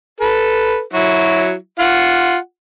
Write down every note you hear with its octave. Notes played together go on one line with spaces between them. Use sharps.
A4 B4
F#3 E4 F#4
F4 F#5